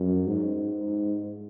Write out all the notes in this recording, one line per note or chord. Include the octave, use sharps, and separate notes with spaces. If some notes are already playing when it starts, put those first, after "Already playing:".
Already playing: F#2
G#2